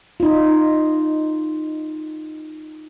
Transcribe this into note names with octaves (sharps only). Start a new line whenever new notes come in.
D#4 F4